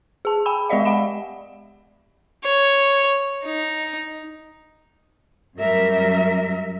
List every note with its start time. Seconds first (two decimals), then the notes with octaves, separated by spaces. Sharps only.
0.25 G#4 A5
0.46 G5 G#5 B5 E6
0.69 G#3 G4 D5 D#5 F5
0.85 F#5 B5 E7
2.45 C#5
3.46 D#4
5.57 F#2 G3 A#4 E5